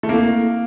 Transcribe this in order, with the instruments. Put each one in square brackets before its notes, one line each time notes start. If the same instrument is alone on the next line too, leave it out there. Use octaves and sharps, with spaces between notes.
[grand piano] A3
[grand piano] A#3 [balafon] C4 E4 A4